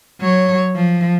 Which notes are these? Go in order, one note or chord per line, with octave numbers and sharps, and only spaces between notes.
F#3 C#5
F3